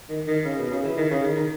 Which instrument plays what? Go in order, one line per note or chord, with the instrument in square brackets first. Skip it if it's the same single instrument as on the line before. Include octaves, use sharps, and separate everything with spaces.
[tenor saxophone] D#3
D#3
C#3
B2
C#3
E3
D#3
C#3
D#3
D#3